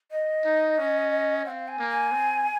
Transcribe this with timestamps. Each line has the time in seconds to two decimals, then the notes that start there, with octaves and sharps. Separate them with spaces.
0.11 D#5
0.45 D#4
0.78 C#4
1.45 C4 F#5
1.50 F5
1.68 G#5
1.79 A#3
1.90 G#5
2.12 C4